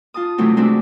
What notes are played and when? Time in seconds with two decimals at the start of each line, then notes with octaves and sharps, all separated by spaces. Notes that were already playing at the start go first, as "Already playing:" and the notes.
0.14 F4 A5 D#6
0.38 C3 E3 F#3 A3 C4
0.56 G#3 A3 C4 D4 E4 F#4